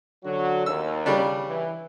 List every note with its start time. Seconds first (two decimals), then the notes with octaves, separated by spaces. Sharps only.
0.24 D3 F#3 F#4
0.66 D#2 E6
1.06 C#3 G3 D4
1.48 E3